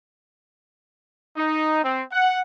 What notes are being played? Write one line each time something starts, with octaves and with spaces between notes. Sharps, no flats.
D#4
C4
F#5